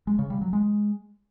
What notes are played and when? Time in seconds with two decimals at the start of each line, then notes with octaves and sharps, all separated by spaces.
0.07 G#3
0.19 C#3
0.30 G3
0.41 F#3
0.53 G#3